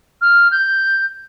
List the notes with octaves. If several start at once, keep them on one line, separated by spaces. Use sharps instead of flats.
F6
G6